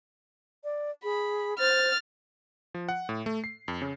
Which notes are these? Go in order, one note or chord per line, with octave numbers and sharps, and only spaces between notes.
D5
G#4 B5
C5 F6 A6
F3
F#5
A2
A3
C7
F2
C#3